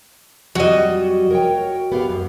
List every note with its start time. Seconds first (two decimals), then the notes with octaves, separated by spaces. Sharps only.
0.55 F2 F#3 G3 F#4 D#5
1.30 A#4 C#5 G5
1.92 B3 G4 F5
2.09 F#2